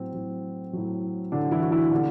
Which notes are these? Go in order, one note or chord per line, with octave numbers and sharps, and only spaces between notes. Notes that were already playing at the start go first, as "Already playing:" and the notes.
Already playing: A2 F#3 C4
A2 F#3
A2 F#3
A2 D3 F#3 D4
E3 E4
F#4
E3 E4
B2 D3 G3 D4